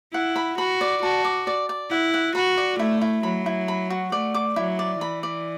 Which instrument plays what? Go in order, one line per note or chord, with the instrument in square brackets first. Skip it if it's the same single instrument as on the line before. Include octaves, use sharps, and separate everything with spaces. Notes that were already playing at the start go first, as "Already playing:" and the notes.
[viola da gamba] E4 [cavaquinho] F#5
[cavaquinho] B5
[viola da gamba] F#4 [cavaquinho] B5
[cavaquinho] D5
[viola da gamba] F#4 [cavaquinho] A5
[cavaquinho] D6
D5
D5
[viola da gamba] E4 [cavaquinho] F#5
[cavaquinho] F#5
[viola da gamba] F#4 [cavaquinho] B5
[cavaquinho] D5
[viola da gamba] A3 [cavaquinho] E4
[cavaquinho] E4
[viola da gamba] F#3 [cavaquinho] B5
[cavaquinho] E4
B5
F#4
[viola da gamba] A3 [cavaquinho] D5
[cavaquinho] D6
[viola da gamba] F#3 [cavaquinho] E4
[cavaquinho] D5
[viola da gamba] E3 [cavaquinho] B5
[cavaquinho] D5